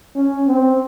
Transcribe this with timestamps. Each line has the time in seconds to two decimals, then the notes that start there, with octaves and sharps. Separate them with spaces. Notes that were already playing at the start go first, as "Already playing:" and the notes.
0.15 C#4
0.47 C4